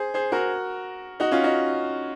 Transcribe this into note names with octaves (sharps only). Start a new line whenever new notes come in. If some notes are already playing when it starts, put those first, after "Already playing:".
Already playing: G#4 C5
G#4 C5
F#4 A#4
D#4 F#4
C#4 F4
D#4 F#4